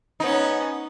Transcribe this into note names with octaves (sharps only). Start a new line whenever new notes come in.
B3 C#4 D#4